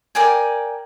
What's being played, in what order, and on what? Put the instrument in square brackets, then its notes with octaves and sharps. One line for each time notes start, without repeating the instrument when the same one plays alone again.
[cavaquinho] A#4 D5 G5 G#5